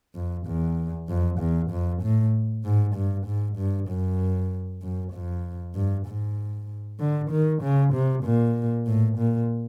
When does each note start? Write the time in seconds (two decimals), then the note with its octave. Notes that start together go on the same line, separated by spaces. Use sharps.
0.15 F2
0.46 E2
1.09 F2
1.39 E2
1.70 F2
2.02 A2
2.64 G#2
2.95 G2
3.26 G#2
3.58 G2
3.88 F#2
4.82 F#2
5.13 F2
5.75 G2
6.06 G#2
7.00 D3
7.31 D#3
7.62 C#3
7.93 C3
8.24 A#2
8.87 A2
9.17 A#2